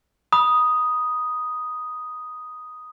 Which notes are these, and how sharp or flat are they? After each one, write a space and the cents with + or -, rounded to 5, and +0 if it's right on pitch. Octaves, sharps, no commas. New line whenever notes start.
B5 -25 D#6 +0